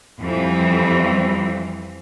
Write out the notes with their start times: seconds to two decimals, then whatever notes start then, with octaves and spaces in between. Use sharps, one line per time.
0.20 F2 E3 F3 G3 C4